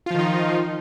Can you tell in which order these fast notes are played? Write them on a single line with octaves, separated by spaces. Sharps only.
F4 F3 D#3 D#4